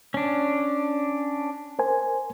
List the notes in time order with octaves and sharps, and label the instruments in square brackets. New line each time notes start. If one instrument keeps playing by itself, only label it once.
[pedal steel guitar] C#4 D4
[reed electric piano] A#4 C5 G#5